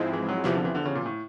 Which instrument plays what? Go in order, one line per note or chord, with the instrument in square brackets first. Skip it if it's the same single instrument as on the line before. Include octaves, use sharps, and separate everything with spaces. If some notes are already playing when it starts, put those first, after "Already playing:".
Already playing: [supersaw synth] G#2 F3 G#3 C4 E4
[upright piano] E3
F#3
[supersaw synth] E2 C3 F3 [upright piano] E3
[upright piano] D3
E3
D3
C#3
A#2
A2